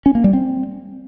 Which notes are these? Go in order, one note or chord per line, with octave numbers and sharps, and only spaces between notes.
C#4
A#3
G3
C4